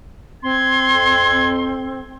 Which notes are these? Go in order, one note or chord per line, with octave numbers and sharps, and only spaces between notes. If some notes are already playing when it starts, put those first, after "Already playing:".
C4 C6 G#6
F2